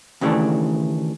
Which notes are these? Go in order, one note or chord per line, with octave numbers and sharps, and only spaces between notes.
D#2 C#3 E3 G3 A3 D4